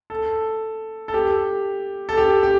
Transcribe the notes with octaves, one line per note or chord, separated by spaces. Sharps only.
A4
A4
G4
A4
G4
G4